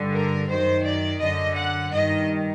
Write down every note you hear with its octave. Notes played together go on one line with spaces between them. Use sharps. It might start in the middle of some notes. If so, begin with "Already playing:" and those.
Already playing: G2 D3
A#4
F#2 D#3 C5
D5
F#2 D3 D#5
F#5
G2 D#3 D#5